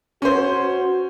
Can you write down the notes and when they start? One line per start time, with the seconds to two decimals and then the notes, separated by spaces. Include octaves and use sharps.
0.22 C#4 F#4 C5